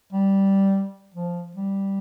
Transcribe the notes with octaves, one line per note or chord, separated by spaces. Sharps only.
G3
F3
G3